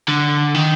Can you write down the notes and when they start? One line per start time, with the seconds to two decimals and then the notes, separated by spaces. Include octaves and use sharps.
0.08 D3
0.55 D#3